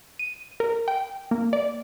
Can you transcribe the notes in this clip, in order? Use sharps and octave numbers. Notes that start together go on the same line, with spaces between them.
D#7
A#4
G5
A#3
D5